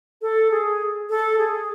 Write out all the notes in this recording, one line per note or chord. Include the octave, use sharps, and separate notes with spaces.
A4
G#4
A4
G#4